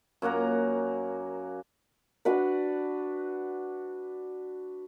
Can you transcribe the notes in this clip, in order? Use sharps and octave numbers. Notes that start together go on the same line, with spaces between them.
F#2 A#3 F#5 A#5
D4 F#4 B4 D5